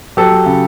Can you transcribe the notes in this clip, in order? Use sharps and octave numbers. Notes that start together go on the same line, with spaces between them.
F#3 G4 A4
F#3
C#3